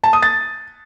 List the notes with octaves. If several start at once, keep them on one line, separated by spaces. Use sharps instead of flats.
A5
D#6
A6